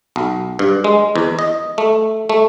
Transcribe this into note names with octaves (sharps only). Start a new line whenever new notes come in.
B1
G2
G#3
E2
D#5
A3
A3